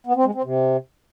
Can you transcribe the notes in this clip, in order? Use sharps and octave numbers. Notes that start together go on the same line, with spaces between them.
B3
C4
G#3
C4
C3